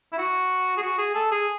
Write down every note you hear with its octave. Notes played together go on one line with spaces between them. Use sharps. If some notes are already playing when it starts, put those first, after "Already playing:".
E4
F#4
G#4
F#4
G#4
A4
G#4